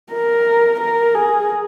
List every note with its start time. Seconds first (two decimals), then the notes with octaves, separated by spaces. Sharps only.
0.13 A#4
0.80 A#4
1.15 G#4